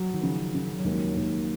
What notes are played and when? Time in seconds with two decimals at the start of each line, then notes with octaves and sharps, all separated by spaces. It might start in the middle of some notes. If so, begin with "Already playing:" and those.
Already playing: F#3
0.14 D#3
0.22 C#3 F3
0.53 C#3 F#3
0.79 F#3
0.84 D#2 G#3
1.16 D#2 A#3